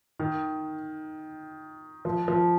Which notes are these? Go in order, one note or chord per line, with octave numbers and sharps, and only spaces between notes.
D#3
F3
F3